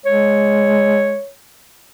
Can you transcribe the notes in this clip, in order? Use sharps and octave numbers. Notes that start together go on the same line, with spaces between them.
G#3 C#5